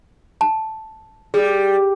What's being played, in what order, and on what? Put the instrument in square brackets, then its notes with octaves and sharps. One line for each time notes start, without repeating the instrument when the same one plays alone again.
[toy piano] A5
[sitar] G3 [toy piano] G#4